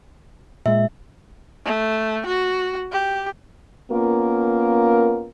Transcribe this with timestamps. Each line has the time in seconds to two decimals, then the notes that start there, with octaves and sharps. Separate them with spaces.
0.66 A#2 G#3 E5
1.65 A3
2.26 F#4
2.92 G4
3.91 A#3 B3 C#4 F4 A#4